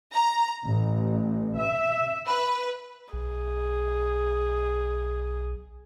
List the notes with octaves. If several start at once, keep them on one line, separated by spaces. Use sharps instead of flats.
A#5
A1
E5
B4
B1 G#4